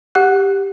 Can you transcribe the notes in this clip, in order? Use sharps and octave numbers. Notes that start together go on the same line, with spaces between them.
G4 F#5 F#6